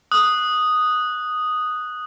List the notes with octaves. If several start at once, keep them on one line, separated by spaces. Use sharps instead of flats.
D#6 F#6